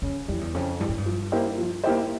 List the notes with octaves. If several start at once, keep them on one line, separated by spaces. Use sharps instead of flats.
F2 C#3
F2 E3 G3
E2
F2 C#3
G2 E3 G3
G#2
G2
F3
A#3 E4 G4 C5
F3
A#3 E4 G4 C5